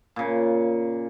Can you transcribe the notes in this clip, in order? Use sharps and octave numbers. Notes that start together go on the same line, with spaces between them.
A#2 C#3